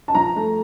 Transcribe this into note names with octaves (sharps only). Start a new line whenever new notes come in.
A5
F3 A#5
A3